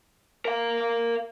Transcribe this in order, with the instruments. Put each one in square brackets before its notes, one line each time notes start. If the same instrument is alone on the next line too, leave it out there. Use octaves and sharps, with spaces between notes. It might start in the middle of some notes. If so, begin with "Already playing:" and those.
[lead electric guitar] A#4 F5